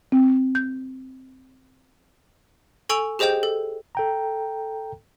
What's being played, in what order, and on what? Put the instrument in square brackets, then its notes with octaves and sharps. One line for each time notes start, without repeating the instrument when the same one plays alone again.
[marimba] C4
G6
[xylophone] A4 G#5 C#6 E6 D7 F7
G4 G#4 C5 D#5 G5 G6
A4
[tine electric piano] A4 G5 A#5